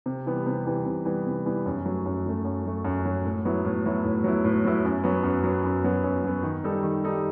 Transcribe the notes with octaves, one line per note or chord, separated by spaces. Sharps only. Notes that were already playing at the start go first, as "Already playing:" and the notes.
C3
E3 G3 B3
C3
E3 G3 B3
C3
E3 G3 B3
C3
E3 G3 B3
F#2
F#3 A3
F#2
F#3 A3
F#2
F#3 A3
F#2
F#3 A3
A2
F#3 B3 E4
A2
F#3 B3 E4
A2
F#3 B3 E4
A2
F#3 B3 E4
F#2
F#3 B3
F#2
F#3 B3
F#2
F#3 B3
F#2
F#3 B3
D#3
G3 D#4 A4
D#3
G3 D#4 A4